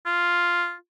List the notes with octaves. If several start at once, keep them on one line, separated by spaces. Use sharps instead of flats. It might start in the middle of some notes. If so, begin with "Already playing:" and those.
F4